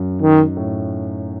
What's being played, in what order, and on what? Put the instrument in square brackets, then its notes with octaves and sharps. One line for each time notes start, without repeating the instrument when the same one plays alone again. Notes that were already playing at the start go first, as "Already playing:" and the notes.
Already playing: [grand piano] F#2
[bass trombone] D#3 [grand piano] D#4
[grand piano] A2